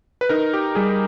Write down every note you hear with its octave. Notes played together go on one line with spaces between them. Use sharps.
B4
D#4 A#4
G4
G3 G#4